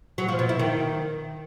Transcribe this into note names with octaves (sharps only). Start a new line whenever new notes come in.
F#3
F3
B2
E4
D#3